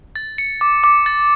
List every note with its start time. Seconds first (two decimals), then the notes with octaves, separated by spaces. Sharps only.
0.16 A6
0.38 C#7
0.61 D6
0.84 D6
1.06 A6